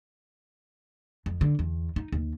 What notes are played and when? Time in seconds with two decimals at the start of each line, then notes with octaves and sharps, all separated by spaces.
1.26 F2
1.41 D3
1.59 E2
1.96 D#4
2.12 D#2